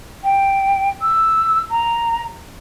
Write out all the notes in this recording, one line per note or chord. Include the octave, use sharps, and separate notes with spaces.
G5
E6
A#5